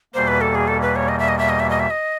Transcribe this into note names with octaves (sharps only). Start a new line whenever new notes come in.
E2 B2 G3 A#3 C5
B4
A4
G#4
A4
B4
C#5
D#5
E5
D#5
E5
D#5
E5
D#5
E5
D#5